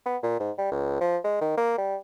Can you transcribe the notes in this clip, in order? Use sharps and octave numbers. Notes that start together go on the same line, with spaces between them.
B3
A#2
G#2
G3
C#2
F3
G#3
D#3
A#3
G3